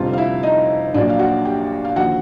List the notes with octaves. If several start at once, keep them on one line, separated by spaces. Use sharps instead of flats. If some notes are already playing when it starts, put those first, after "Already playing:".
Already playing: F1 F2 D3 G3 F4 F5
F5
E4 E5
D#4 D#5
A#1 A#2 F#3 D4 D5
F5
F#4 F#5
G4 G5
F5
D#2 D3 F3 F#4 F#5